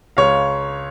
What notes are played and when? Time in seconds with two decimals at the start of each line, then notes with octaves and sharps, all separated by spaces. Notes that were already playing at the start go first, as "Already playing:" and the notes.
0.17 C#2 C#5 F5